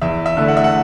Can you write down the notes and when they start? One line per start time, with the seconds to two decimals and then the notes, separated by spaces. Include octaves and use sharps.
0.01 E2 E5
0.26 E5
0.37 D3 A3 E4
0.48 F#5
0.57 E5
0.64 F#5